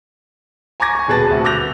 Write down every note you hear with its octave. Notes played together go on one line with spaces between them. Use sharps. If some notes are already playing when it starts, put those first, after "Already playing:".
G#5 A#5 C#6 D6 G#6 A#6
G#5 C#6
D#1 B2 G#4 B4 A5 A6
D2 C3 F#4
D6 E6 F#6 G6 A#6 F7